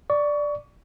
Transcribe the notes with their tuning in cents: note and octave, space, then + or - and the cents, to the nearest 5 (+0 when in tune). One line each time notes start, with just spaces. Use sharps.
D5 +0 C#6 +25